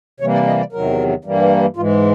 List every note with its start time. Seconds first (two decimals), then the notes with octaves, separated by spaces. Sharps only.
0.20 C3 E3 G3 A#3 C#5
0.33 D5
0.47 D#5
0.59 D5
0.72 E2 C3 D#3 F#3 A#4
1.24 G2 E3 G3 A#3
1.76 G#2 E3 G#3 F4